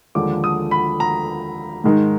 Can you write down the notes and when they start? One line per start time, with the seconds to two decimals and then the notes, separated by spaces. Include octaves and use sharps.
0.15 D#2 D3 F3 G#3 D6
0.44 D#6
0.71 B5
1.00 A#5
1.84 G#2 D#3 G#3 D#4